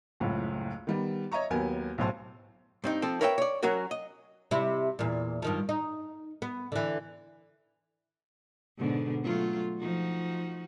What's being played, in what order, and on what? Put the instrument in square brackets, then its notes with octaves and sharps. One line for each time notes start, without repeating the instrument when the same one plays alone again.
[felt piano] F#1 C#2 A2
D#3 G3 B3
C#5 D#5 E5 A#5 C#6
D#2 F#3 B3 A#4 G#5
B1 A2 C5 A5
[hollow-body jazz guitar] G2 C4 D#4
F3 C4 A4
A#4 B4 C#5 E5 F5 G5
C#5 D5
F#3 C#4 F#4 A#4
D#5
[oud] C3 E4
E2 A#2
G2 D#3 F3
D#4
B3
D3 E3
[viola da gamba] G#2 B2 D3
F#3 A3 F4
F3 D#4 F#4